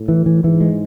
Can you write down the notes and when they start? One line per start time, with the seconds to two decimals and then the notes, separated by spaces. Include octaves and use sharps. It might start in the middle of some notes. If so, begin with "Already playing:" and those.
Already playing: A2
0.08 E3
0.26 E3
0.44 G#2 E3
0.61 G#3